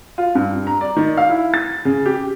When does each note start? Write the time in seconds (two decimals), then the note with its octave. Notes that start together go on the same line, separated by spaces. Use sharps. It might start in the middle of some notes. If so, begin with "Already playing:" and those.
0.18 F4
0.35 G2
0.67 A#5
0.81 D5
0.96 D#3
1.17 F5
1.29 E4
1.54 A6
1.85 C#3
2.06 G4